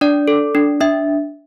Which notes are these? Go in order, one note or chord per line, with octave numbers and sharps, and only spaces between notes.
D4 D5
A4
D4
D4 E5